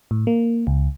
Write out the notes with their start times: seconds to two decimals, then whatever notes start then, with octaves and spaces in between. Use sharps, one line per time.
0.11 A2
0.27 A#3
0.67 C#2